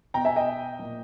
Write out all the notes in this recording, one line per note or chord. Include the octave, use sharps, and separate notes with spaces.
B2 G5 A#5
E5 G#5
D#5 G5
A#2